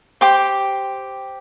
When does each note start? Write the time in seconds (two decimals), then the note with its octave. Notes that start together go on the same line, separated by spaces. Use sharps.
0.21 G4 C5 G5 D6